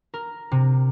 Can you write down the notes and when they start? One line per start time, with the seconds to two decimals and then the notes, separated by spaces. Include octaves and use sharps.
0.14 A#4
0.51 C3